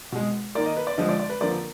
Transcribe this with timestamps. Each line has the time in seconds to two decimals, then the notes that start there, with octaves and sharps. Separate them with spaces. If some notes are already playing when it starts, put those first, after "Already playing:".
0.12 B2 G#3
0.55 D#3 A#3 D5
0.66 D#5
0.77 B4
0.87 D5
0.97 D3 F3 G#3 D#5
1.09 D5
1.20 D5
1.30 B4
1.41 D3 F3 A#3 D5